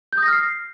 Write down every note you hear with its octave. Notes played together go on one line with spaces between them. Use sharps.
G6
D#6
A#6
F6
C7